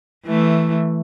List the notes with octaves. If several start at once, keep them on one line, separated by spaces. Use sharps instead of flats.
E3 A3